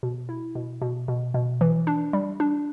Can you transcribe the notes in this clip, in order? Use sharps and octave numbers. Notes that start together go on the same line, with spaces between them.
B2
E4
B2
B2
B2
B2
E3
D4
G3
D4